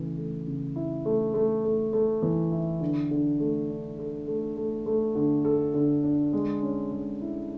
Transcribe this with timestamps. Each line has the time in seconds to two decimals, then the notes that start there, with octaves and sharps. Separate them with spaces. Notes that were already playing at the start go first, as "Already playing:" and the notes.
Already playing: C#3 E3 A3
0.18 A3
0.47 C#3
0.76 E4
1.06 A3
1.34 A3
1.65 A3
1.93 A3
2.22 E3
2.52 E4
2.81 D3
3.11 D3
3.40 A3
3.69 D4
3.99 A4
4.27 A3
4.57 A3
4.86 A3
5.15 D3
5.45 A4
5.74 D3
6.03 D4
6.33 G#3
6.62 C#4
6.91 G#3
7.21 E4